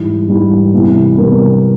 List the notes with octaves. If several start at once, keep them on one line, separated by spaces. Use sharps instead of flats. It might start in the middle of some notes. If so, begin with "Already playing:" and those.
Already playing: G#2 E3 G3
G#2 E3 G3
C3 E3 G3 B3
C3 E3 G3 B3 A#4